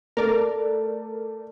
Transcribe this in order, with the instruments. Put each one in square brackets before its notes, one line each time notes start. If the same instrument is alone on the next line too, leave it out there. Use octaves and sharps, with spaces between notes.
[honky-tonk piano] A3 [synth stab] A#4 D5